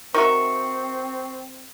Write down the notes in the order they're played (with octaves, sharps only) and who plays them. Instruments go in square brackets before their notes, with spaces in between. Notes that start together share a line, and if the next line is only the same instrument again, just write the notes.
[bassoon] C4 [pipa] D#4 F#4 E5 [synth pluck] A#4 [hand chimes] C#6